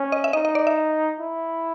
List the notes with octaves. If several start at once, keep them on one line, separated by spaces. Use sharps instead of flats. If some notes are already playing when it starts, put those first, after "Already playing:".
Already playing: C#4
D#5
E5
D#4 D#5
D#5
D5
E5
E4